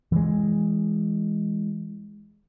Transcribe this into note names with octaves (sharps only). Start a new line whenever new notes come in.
E3 G#3